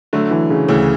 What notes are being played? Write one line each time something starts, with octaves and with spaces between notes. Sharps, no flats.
D3 F#3 A3
E3
C#3
D2 C#3 E3